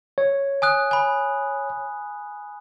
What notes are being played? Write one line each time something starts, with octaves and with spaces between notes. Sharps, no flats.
C#5
G#5 D#6 F#6
G#5 B5